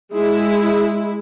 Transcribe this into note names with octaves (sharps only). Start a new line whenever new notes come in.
G#3 E4